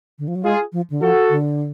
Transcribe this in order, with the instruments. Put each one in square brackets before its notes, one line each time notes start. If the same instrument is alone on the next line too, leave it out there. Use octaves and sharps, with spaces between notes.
[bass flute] D3
F3
F#3
[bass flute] G#3 [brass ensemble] F4 G#4
[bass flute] F3
D3
[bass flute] F3 [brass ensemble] F#4 A4
[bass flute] D3